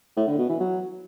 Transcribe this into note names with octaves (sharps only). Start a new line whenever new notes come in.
A2
D3
B2
E3
F#3